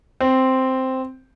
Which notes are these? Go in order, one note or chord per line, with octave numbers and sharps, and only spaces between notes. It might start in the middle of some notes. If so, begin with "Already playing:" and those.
C4